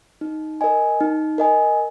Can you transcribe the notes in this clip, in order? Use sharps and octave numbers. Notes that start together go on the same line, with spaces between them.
D#4
A#4 D#5 G#5
D#4
A#4 D#5 G#5